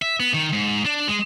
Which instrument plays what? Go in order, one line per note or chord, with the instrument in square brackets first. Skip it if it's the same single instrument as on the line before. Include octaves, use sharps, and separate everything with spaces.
[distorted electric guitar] E5
B3
D#3
G#2
D4
G#3